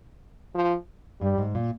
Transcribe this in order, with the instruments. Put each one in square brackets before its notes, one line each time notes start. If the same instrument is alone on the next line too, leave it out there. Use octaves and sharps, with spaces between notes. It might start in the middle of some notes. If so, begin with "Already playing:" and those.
[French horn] F3
[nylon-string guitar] G2 [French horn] G3
[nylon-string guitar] G#2
A#2